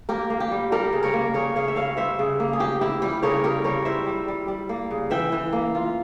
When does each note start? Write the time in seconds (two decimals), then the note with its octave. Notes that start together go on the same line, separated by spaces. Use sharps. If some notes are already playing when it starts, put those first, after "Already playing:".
0.09 A#3 G4 A#4
0.30 A#3
0.40 G4
0.52 G3
0.72 G3 G4 A#4
0.93 C#3
1.03 A#4 C#5
1.13 A#3
1.33 C#3 A#4 C#5
1.55 C#3 C#5 F5
1.68 E5
1.76 G3 C#5 F5
1.97 G3 C5 E5
2.19 C#3
2.40 A#3
2.53 G#4
2.60 A#3 G4
2.81 E4 G4
3.02 G3 G4
3.23 C#3 A#4 C#5
3.44 C#3 G4 A#4
3.64 G3 A#4 C#5
3.85 E4 C5 E5
4.07 G3
4.28 G3
4.48 G3
4.69 A#3
4.91 C#3
5.10 E3 E5 G5
5.32 E3
5.53 A#3
5.75 F4